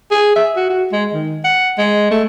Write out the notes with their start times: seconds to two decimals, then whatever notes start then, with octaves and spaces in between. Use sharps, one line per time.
0.11 G#4
0.36 E5
0.56 F#4
0.70 F#4
0.92 G#3
1.13 D#3
1.45 F#5
1.78 G#3
2.11 A3